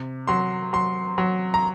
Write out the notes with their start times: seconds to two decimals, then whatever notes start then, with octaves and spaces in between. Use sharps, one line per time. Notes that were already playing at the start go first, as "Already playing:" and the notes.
Already playing: C3
0.27 F#3 C6
0.73 F#3 C6
1.18 F#3
1.54 A#5